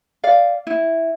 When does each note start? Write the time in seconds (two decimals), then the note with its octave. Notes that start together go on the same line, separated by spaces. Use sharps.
0.24 D5 F5
0.67 E4